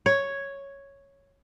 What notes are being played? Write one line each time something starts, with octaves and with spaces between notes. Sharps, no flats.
C#5